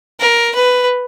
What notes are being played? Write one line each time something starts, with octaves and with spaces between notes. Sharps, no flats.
A#4
B4